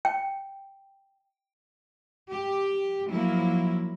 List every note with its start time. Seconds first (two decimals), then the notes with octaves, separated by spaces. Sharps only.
0.05 G5
2.30 G4
3.11 F3 F#3 A#3 E4